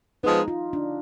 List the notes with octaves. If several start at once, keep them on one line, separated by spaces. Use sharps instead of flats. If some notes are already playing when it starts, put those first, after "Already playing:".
F3 G#3 B3 D#4
F4
D4